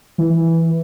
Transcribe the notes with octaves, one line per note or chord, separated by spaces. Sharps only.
E3